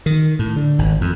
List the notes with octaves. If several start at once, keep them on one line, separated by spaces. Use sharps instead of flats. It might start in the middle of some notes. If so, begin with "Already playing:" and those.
D#3
A2
D3
G#1
F2